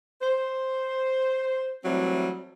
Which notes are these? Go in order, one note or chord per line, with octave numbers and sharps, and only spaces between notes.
C5
E3 F#3 G3 A3 C4